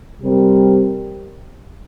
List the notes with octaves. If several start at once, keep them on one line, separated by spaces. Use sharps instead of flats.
C3 G3 C4 G4 A#4